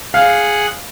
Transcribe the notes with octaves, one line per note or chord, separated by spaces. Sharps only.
G#4 F5 F#5